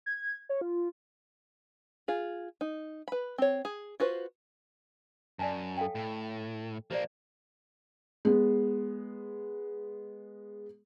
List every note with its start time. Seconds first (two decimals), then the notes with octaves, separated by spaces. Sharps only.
0.06 G#6
0.49 C#5
0.61 F4
2.08 F4 G#4
2.61 D#4
3.08 B4 B5
3.38 C4 C#5
3.65 G#4
4.00 F4 F#4 B4 C5
5.39 F#2 D5 G#5 A5
5.77 A4 F5 G5
5.95 A2
6.91 F3 A#3 G4 C5 D5
8.25 G#3 B3